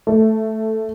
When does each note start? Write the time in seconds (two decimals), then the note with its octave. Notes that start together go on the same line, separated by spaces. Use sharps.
0.07 A3